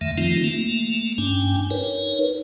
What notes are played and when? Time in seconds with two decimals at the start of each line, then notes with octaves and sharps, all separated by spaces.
0.01 F2 D#3 A3 E5
0.18 D#3 F3 A3 C4 D#4 F4
0.44 A3 A#3
1.18 G2 C#4 D4 G5 G#5
1.71 D#4 A#4 B4 C#5